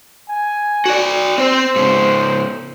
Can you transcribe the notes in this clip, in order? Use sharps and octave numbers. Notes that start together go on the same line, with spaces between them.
G#5
F#4 D5
C4 C5
G#2 C#3